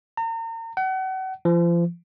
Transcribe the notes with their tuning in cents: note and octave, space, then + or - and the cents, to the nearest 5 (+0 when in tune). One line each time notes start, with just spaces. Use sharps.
A#5 -40
F#5 +35
F3 -35